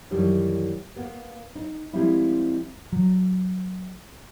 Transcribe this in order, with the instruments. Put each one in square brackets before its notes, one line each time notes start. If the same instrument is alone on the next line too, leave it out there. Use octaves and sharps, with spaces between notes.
[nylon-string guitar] F#2 D#3 E3 G3 A3 D#4
A#3 B3
D#4
F3 G3 G#3 C4 E4
[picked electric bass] F#3